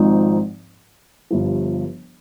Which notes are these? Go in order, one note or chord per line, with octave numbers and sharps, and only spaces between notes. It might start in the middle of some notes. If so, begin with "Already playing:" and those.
Already playing: G#1 G#2 F3 C4 D#4
G1 G2 F3